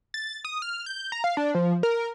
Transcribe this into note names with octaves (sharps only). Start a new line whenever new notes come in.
A6
D#6
F6
G6
A#5
F5
D4
F3
A#4